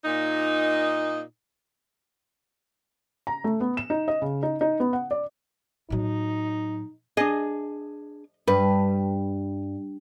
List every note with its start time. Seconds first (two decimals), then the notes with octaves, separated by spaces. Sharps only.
0.05 A#2 D#4
3.27 A#5
3.44 A3
3.61 B3
3.77 E7
3.90 D#4
4.08 D#5
4.22 C#3
4.43 D#4
4.61 D#4
4.80 B3
4.93 F#5
5.11 D5
5.90 A2 F#3 D#4
7.17 D4 G#4 D#5
8.47 G2 B4